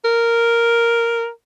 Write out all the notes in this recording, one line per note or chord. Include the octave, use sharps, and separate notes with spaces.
A#4